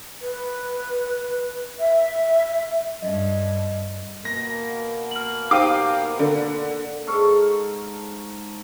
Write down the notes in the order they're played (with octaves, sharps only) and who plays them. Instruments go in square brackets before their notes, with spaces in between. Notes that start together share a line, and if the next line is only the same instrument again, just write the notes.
[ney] B4
E5
[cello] G2 [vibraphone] D#5
[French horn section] B2 A#3 [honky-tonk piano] A#6
[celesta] F6 F#7
[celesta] D#4 C5 D#7 [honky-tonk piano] G4 F5 D6
[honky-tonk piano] D3 [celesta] A4 A#4
[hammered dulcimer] G#2 A4 F5 C#6